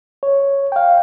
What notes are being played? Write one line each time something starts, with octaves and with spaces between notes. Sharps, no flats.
C#5
F5 G5